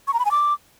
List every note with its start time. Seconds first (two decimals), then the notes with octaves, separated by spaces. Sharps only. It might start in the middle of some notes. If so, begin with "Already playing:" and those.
0.08 C#6
0.13 A#5
0.19 B5
0.25 G#5
0.31 D6